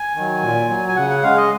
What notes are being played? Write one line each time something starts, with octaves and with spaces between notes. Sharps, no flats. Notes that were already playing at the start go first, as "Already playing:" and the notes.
Already playing: G#5
D#3 F#3
A#2
F#3
G#5
C#3 F#5
F#5
G#3 F5
D#5